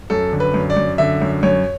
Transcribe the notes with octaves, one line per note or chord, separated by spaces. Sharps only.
F#2 A4
D3
B4
F#2
D5
F#2
D3 E5
F#2
F#2 C#5